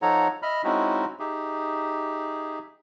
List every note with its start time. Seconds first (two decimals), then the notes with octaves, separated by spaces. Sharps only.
0.02 F3 D#4 A4 C#5 F#5 A#5
0.43 D#5 E5 B5 F6
0.64 G#3 C4 C#4 D#4 E4 F#4
1.19 D#4 G4 G#4 E5